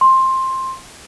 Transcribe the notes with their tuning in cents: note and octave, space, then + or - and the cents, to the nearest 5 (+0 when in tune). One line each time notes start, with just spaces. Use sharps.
C6 +10